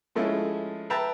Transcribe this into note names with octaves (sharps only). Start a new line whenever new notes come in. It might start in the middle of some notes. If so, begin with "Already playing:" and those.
F3 G#3 A3 C#4 E4
B4 E5 G5 A5 A#5